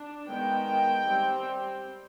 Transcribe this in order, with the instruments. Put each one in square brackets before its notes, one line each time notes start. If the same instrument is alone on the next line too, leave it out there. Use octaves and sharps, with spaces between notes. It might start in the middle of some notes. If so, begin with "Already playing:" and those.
Already playing: [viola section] D4
D#3 G#3 B3 G5
G3 C4